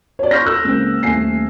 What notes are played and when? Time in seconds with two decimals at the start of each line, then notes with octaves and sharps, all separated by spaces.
0.19 C#5 D5
0.31 C6 C#6 F6 G6 A#6
0.46 A4 E6 F#6
0.65 C#2 A#3 C4
1.03 D#1 A3 C4 G#5 C7